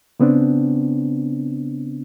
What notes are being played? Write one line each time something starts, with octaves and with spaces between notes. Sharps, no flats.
C#3 B3 C4 D4